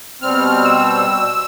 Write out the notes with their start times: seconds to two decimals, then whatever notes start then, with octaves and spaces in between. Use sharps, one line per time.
0.22 B2 G3 C4 F6
0.64 E6